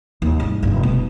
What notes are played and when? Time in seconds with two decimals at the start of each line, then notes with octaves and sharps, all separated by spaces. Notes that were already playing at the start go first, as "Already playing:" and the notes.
0.22 D#2
0.40 G#2 G3
0.63 F1 G2
0.83 B2